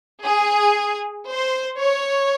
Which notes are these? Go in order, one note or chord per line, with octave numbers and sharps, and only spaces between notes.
G#4
C5
C#5